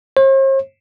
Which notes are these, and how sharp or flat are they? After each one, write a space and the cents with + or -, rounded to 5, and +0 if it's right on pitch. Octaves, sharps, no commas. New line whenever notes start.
C5 +45